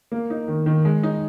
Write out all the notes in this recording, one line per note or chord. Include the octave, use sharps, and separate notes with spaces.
A#3
D#4
D#3
D#3
G#3
D#4